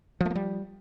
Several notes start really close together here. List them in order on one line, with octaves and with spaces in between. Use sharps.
F3 A3 A#3 G3